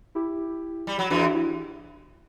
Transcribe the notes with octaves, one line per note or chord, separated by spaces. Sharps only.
E4 G4
G3
F#3
E2 E3 D4 F#4
E4 G4